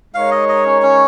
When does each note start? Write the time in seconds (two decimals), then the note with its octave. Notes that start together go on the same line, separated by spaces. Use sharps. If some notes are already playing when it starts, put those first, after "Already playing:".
0.14 G#3 D#4 A#4 C#5 F5
0.31 D#5
0.49 D#5
0.65 C#4
0.82 C#4